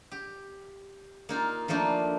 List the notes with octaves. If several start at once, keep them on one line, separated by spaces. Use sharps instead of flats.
G4
A#3 D#4 F4
F3 A3 A#3 D4 D#4